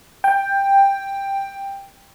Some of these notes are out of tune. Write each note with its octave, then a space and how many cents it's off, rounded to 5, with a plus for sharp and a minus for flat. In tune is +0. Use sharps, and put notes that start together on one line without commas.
G5 +10